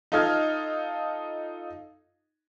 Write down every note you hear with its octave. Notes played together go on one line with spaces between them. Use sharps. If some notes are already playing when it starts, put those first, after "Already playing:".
D#4 F4 A4 D#5 F6 G#6